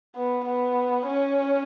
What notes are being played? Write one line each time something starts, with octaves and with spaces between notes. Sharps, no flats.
B3
B3
C#4